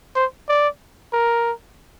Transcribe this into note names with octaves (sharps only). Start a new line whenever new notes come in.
C5
D5
A#4